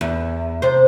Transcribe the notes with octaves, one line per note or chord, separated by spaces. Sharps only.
E2
C3 C5